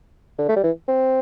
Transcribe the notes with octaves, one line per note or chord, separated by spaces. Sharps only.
D3
A3
G3
E3
C4